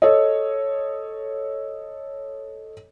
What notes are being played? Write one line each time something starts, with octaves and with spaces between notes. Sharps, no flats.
A4 C#5 D#5